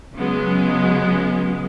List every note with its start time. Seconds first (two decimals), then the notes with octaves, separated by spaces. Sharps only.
0.15 C#3 F#3 G#3 B3